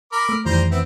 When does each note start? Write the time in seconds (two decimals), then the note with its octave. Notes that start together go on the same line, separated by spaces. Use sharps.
0.12 A#4 B5 D6
0.29 A3
0.45 F2 D#3 E3 G3 C5 A#5
0.71 B3 C4 E4